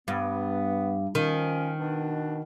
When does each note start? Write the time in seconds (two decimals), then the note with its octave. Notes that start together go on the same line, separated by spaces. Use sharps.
0.08 G2 B3
1.15 D#3 F3 C#4
1.79 B2 D4